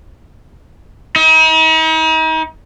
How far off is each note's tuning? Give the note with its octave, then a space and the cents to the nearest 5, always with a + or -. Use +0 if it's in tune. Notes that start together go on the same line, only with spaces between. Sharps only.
D#4 +40